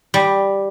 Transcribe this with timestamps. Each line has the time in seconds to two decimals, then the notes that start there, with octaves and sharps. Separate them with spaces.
0.14 G3